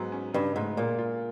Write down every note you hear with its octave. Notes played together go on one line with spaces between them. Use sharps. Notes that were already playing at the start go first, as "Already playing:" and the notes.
Already playing: G#2 F#3 B3
C#4
G2 C#3
G#2 A3
A#2 G#3
F4